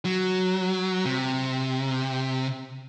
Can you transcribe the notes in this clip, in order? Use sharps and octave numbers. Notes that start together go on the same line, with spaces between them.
F#3
C3